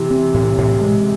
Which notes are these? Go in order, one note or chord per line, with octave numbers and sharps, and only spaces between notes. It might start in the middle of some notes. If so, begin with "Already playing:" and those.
Already playing: C3 E3
C4
A2
A2
G#3